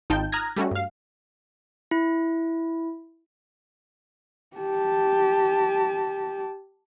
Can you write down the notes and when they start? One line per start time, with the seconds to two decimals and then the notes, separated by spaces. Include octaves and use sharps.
0.10 G#1 D#4 F4 G5 A5 G6
0.32 A#5 D#6 F6 F#6 G#6 A#6
0.57 G3 A3 C#4 F#4
0.71 G2 F5
1.91 E4
4.57 G4 A5